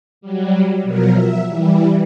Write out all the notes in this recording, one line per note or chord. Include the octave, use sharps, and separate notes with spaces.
F#3 G3
B2 F3 F#3 A#4
E5
E3 G3